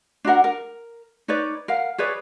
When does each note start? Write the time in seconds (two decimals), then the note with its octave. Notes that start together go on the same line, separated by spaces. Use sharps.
0.25 D4 F#4 A#4 F#5
0.44 A#4
1.28 D#4 B4 C#5 D5
1.68 A#4 F5 F#5
1.98 G#4 B4 C#5 D5